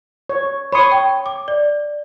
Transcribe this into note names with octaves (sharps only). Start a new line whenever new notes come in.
C#5
C#5 B5 C6 D#6 C#7
G5
D6
D5